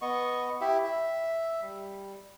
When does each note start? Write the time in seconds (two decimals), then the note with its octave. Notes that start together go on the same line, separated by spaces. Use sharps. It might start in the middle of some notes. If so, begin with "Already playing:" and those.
0.02 B3 D#5 C#6
0.61 E4 G4 E5
0.84 E5
1.62 G3